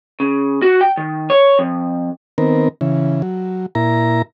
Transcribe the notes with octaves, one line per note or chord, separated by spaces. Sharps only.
C#3
F#4
G5
D#3
C#5
F2
D#3 B3 C4 A#4
C#3 E3
F#3
A#2 E4 A#5